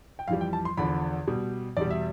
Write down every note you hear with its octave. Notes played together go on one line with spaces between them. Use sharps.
G5
F2 E3 G3 F5
G5
A5
C6
E2 D3 F3 B5
B2 G3
E2 B2 G3 D5
E5